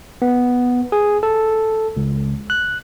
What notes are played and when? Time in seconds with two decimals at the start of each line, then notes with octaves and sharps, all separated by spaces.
0.22 B3
0.92 G#4
1.23 A4
1.97 C#2
2.50 F#6